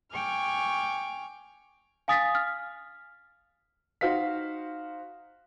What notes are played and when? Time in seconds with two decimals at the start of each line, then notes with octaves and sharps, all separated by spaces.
0.12 G5 G#5 C#6 D6 F6
2.08 F5 G#5 D#6 A6 B6
2.35 F6
4.01 D#4 F#4 C5 F5 B6